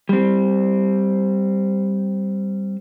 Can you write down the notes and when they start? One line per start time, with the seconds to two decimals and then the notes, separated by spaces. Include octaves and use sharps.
0.09 G3 C4